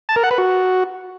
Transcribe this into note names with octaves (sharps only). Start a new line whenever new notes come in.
A5
A#4
F#5
B4
F#4